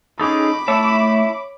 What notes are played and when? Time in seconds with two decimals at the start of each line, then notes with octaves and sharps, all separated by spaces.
0.20 C#4 D#4 G#4 A4 B5 D6
0.68 A3 E4 C#5 E5 A5